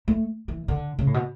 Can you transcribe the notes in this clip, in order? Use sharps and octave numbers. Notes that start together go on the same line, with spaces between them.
A3
E3
D3
C#3
A2
B2